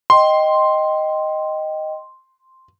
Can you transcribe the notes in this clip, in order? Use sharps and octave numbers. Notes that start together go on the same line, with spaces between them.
D#5 G5 C6